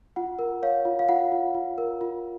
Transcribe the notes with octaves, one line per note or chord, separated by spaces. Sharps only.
F4 F#5
A#4
C#5 F5
F4
F5
F4 F#5
F4
F4
A#4
F4